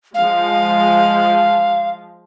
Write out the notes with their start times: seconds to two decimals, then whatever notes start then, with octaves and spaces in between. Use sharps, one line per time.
0.14 F3 G#3 F5